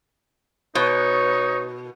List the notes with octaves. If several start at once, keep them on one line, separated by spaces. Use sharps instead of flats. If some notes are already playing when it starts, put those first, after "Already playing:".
B2 D#4 B4 C#5